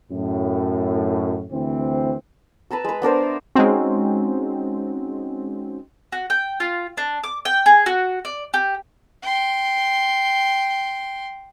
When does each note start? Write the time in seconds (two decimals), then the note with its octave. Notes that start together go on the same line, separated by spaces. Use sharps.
0.11 F#2 A2
1.51 D2 E3 C4
2.71 B4 A5 A#5 E6
2.84 G#3 B4
3.02 B3 D4 A#4 C5
3.23 E5
3.55 G#3 C4 C#4 D#4 F#4
6.12 F#4
6.30 G5
6.60 F4
6.97 D4
7.24 D6
7.45 G5
7.66 G#4
7.86 F#4
8.25 D5
8.54 G4
9.22 G5 C6